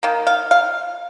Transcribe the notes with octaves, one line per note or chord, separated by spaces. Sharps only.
D#3 A#3
F5
F5